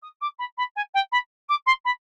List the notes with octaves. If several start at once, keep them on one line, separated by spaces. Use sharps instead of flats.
D#6
D6
B5
B5
G#5
G5
B5
D6
C6
B5